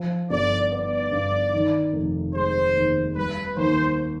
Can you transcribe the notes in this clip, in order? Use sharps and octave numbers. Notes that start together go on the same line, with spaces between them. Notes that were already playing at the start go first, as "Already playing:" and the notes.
Already playing: F3
G1 D5
B3 D5
G2
D#3
F1
G#3 C5
D#2
G3 B4
D#2 C5